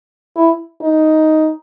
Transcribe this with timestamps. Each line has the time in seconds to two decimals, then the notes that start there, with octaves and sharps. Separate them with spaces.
0.37 E4
0.81 D#4